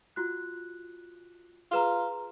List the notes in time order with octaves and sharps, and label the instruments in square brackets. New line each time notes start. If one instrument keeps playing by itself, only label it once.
[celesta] F4 F#4 F#6
[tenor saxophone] F4 [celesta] G#4 B4 A#5